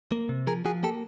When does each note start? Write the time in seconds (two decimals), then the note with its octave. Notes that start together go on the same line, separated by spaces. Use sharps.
0.12 A#3
0.29 C3
0.47 F3 G#4 A#4
0.65 F3 F#4 G#4
0.83 A#3 G4 A4